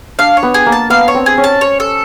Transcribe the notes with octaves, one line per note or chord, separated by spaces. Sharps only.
D4 F5
C#5
B3
G#4
A#3
A5
B3 F5
C#5
C4
G#4
C#4
A5
C#5
A4